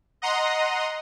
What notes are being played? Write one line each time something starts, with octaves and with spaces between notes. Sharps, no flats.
D#5 F#5 A#5 C6 D#6